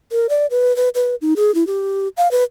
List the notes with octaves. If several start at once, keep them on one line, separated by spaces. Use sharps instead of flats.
A#4
D5
B4
B4
B4
D#4
G#4
E4
G4
F5
B4